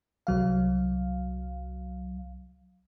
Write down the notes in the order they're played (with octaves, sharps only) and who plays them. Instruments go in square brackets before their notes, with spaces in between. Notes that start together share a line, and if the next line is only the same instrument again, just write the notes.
[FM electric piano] C2 F#3 F5